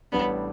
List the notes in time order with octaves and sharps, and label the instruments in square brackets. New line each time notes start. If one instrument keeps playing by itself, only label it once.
[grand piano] A1 A2 G3 D4 [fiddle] B3